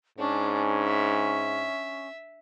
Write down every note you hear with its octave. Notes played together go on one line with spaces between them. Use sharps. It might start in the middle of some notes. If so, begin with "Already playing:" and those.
G#2 C#4 D4
E5